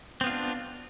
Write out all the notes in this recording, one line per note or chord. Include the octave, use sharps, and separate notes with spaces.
B3 C4 D4 F4